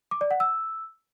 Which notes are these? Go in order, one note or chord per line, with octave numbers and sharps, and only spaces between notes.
D6
D5
F#5
E6